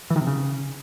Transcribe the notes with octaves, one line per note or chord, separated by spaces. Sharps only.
E3
D#3
C3
C#3